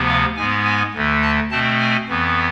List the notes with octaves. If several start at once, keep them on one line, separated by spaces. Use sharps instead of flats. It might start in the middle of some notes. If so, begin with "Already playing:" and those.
Already playing: D2 C3 F3 B3
F5
G#2 G#3 B3 G#5
G#5
D2 D3 A3
A5
B2 A3 C4 A5
G#5
F2 E3 B3